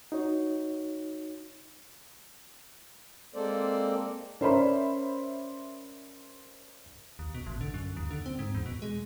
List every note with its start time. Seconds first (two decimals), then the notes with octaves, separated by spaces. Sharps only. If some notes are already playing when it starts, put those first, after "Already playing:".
0.12 D#4 F#4 C#5
3.35 G#3 A#3 C4 A4 C5 D5
4.41 C#4 A#4 C5 D5 E5 B5
7.19 D#2
7.34 B2
7.46 A1
7.61 D3
7.74 F#2
7.97 D#2
8.11 D3
8.26 C4
8.39 G#2
8.55 E2
8.66 B2
8.82 G#3